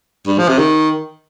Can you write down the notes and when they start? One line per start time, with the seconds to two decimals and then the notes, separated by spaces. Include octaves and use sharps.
0.27 G2
0.38 F3
0.48 C3
0.58 D#3